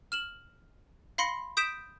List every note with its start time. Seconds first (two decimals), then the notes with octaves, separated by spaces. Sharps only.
0.12 F6 E7 F#7
1.18 F5 B5 C6 A#6 C#7
1.57 D#6 G6 B6 D7 E7